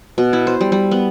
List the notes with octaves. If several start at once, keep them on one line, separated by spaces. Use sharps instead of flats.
B2
E4
C5
G3
G3
B3